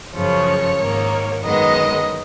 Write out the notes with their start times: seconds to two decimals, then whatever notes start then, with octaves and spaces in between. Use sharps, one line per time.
0.14 F#2 C#3 F3 C#5
0.79 G#2 D#3 A#3
1.42 F#2 D#3 G#3 B3 D#5